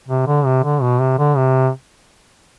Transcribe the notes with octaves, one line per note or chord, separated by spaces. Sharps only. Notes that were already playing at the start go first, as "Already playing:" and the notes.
C3
D3
C3
D3
B2
C3
D3
C3